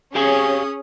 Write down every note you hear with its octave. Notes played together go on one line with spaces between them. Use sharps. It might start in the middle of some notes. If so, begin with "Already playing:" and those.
C#4 G4 G#4 F5 G#5 D#6